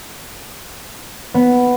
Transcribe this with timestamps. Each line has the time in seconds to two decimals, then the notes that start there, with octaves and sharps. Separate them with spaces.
1.34 B3